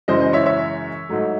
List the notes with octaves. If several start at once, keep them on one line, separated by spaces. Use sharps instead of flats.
F#2 C#3 E3 G#3 C5 D#5
C5 D#5
C#5 E5
C#5 E5
G#2 F#3 A3